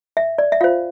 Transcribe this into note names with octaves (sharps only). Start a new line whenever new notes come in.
E5
D5
E5
F4 C5 F5